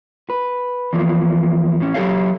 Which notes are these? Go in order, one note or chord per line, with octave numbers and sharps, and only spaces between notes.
B4
E2 E3 F3 A#3
A2 C#4
F#3 G4 A4 C#5 F5